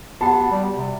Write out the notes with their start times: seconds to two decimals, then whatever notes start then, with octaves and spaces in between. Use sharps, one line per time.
0.21 B3 F#4 G4 F#5 A5
0.51 G3
0.76 C3